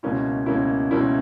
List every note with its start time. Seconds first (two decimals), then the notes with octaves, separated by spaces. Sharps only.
0.03 C#2 B2 A#3 C#4 E4
0.46 C#2 B2 A#3 C#4 E4
0.91 C#2 B2 A#3 C#4 E4